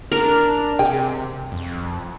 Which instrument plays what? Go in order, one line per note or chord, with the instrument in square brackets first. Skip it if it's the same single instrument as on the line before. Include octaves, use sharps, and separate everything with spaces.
[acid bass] D4 [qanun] A#4
[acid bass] C3 [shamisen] G#4 G5
[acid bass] F2